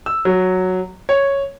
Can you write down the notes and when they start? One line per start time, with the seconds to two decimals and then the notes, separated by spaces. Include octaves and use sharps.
0.06 E6
0.25 F#3
1.09 C#5